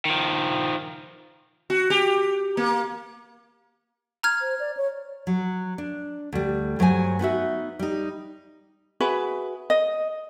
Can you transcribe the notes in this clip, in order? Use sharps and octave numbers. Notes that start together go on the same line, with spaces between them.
D#3 F3
F#4
G4
A#3
A#5 F6 G#6
C5
D5
C#5
F#3
D4
D2 G3
G2 F#3 C5 F#5 G#5
B3 D#4 F#4 E5
G3 D#4
F#4 G#4 B4 E5
D#5